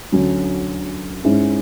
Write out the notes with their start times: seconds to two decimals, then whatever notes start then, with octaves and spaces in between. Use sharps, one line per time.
0.12 D2 D3 F#3 C#4
1.24 G#2 G#3 C#4 E4